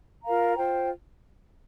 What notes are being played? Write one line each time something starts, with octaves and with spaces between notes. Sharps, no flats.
F4 A#4 F5 A#5
F4 C5 G5